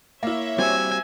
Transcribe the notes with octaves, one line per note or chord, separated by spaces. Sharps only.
A#3 E4 C#5 E5
G3 C4 F#4 G#5 E6